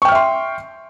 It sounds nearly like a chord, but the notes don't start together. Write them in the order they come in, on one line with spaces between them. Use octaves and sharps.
C#6 G5 F6 E5 C6